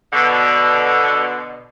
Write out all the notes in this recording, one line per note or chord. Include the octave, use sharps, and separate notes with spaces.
B2 D3